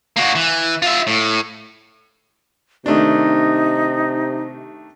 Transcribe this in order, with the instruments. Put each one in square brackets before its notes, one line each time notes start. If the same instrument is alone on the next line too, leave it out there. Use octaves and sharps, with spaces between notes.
[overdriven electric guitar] A#3 F#4
E3
F4 E5
A2
[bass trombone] C3 [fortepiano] D#3 A3 D4 [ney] D#4